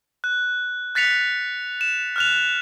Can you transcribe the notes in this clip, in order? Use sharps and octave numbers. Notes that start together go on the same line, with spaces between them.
F#6
F#6 A6 B6 C#7 F7
E7
F6 F#6 F7